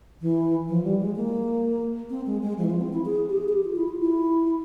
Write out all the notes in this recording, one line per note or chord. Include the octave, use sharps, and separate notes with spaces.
E3
F3
G3
G#3
A#3
C4
G#3
G#3
F3
E3
F3
C4
E4
G#4
G4
G#4
G#4
G4
F4
E4
F4
E4